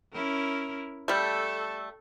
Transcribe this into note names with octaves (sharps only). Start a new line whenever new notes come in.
C#4 E4 A#4
G3 A3 A4